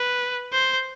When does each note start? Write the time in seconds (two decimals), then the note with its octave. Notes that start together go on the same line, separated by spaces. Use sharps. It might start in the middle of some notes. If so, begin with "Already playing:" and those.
Already playing: B4
0.53 C5